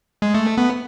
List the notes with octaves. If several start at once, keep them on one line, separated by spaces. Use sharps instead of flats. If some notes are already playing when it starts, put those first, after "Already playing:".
G#3
A3
B3